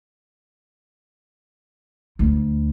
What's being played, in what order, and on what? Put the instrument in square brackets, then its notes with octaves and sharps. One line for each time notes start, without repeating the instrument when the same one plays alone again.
[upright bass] D2